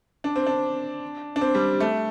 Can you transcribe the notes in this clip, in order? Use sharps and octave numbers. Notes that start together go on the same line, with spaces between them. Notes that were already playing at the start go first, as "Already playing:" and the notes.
D4
C4
D4
D4
C4
G3
A3